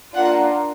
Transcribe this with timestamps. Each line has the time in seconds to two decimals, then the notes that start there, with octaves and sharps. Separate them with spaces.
0.15 A#3 D4 F4 F#5